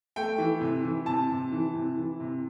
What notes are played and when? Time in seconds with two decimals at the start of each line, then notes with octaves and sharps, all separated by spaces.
0.16 A3 G5
0.38 E3
0.61 C3
0.83 E3
1.06 C3 A5
1.30 C3
1.52 E3
1.75 C3
1.97 E3
2.20 C3